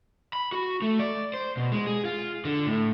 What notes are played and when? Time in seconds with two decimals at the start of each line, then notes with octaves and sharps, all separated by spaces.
0.33 B5
0.52 F#4
0.82 A3
0.99 D5
1.34 C5
1.57 B2
1.72 G#3
1.87 G#4
2.05 F4
2.45 D3
2.66 A2